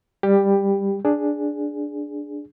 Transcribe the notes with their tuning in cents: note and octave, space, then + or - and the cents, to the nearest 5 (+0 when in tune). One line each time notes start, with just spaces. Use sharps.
G3 +15 G4 +10
D4 +0 G#4 +0